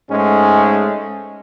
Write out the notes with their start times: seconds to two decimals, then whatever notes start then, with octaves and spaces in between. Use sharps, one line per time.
0.10 G#2 G#3 A3 C#4